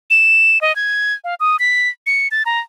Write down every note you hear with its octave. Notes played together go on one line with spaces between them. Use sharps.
E7
D#5
G#6
F5
D#6
B6
C#7
A6
A#5